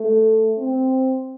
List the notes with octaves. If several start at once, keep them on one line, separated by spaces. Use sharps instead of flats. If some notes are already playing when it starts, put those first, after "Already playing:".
Already playing: A3
C4